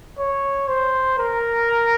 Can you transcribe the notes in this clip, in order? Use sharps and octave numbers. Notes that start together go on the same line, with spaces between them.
C#5
C5
A#4